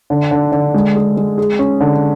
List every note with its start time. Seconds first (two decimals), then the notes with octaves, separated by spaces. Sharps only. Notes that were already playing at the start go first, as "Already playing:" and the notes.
0.10 D3
0.31 D3
0.52 D3
0.74 G#3
0.95 G#4
1.17 G#3
1.38 G#4
1.59 C#4
1.80 D3